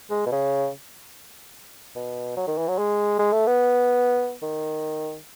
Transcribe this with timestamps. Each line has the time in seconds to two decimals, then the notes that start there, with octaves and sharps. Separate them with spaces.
0.11 G#3
0.26 B2
0.32 C#3
1.96 B2
2.37 F#3
2.48 D#3
2.58 E3
2.68 F#3
2.78 G#3
3.19 G#3
3.33 A3
3.47 B3
4.42 D#3